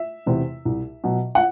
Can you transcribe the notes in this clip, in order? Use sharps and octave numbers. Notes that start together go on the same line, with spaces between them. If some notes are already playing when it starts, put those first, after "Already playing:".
Already playing: E5
E2 C3 E3
C2
B2 F#3
F#5